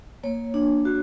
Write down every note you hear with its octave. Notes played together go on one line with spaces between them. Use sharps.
A#3 C#5
D4
F#4